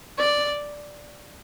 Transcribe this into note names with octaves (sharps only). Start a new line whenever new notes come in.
D5